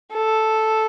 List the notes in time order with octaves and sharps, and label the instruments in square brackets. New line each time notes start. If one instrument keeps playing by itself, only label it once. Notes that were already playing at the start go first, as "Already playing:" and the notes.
[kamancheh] A4